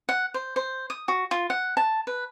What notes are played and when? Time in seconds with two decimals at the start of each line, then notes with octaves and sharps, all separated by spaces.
0.09 F#5
0.34 C5
0.56 C5
0.90 D#6
1.08 F#4
1.31 F4
1.50 F#5
1.77 A5
2.07 B4